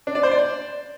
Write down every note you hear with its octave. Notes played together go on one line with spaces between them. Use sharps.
D4
D5
C5
D5